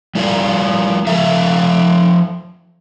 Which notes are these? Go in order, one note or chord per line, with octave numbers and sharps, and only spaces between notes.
G3 E4 F4 D5 F5
F3 A4 E5 F5